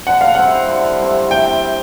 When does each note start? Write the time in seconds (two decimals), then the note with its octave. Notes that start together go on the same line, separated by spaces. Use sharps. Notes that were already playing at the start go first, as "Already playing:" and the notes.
0.07 D3 F#5
0.21 F5
0.35 G3 C4 E4 F#5
0.68 D3
0.99 G3 C4 E4
1.30 C3 G5